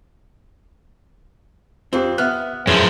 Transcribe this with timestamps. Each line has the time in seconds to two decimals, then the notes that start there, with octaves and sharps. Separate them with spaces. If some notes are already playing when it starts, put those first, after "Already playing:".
1.93 F2 C4 F4 G4
2.18 B3 E5 F6 F#6
2.67 F#2 A2 F3 G#4 B4